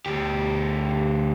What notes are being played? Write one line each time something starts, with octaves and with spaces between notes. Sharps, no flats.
D2 G4